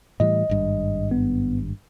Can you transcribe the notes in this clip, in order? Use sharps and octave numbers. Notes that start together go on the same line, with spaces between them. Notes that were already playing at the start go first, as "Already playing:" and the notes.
A2 E3 G3 D#5
G#1 G2
B3